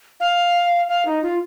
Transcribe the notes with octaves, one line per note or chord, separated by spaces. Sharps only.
F5
F5
D#4
F4